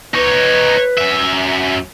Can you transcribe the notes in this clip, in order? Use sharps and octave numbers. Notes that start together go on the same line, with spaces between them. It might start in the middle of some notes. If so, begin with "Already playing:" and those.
D#4 B4 C#5
F#2 E5